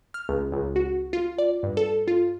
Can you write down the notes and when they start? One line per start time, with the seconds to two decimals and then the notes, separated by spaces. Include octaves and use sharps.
0.14 F6
0.29 C#2
0.52 C#2
0.76 F#4
1.13 F4
1.38 D5
1.63 G2
1.77 A4
2.08 F4